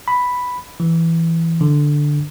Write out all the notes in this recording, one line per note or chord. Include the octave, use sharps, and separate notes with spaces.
B5
E3
D3